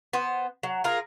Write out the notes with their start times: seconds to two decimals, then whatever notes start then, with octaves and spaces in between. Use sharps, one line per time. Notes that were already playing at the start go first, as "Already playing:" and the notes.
0.13 B3 C5
0.63 F#3
0.84 F4 G#4 A#4